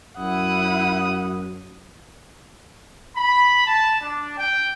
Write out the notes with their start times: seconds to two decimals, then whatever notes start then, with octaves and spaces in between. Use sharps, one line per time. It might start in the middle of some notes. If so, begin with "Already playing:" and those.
0.18 F#2 E4 F#5 D#6
3.16 B5
3.65 A5
4.01 D4
4.37 G5